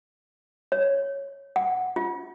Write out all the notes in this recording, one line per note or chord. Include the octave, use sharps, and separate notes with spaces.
C#5
F#5
F4